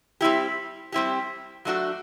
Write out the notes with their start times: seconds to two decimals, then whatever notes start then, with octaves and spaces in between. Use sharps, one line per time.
0.21 G3 C4 E4 G4
0.92 G3 C4 E4 G4
1.65 F#3 A3 D4 F#4